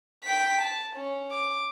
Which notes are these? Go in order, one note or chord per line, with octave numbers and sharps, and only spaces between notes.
G5 B6
A5
C#4
D6